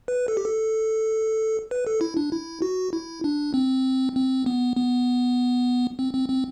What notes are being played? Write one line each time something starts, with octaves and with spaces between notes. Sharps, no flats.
B4
A4
G4
A4
B4
A4
E4
D4
E4
F#4
E4
D4
C4
C4
B3
B3
C4
C4
C4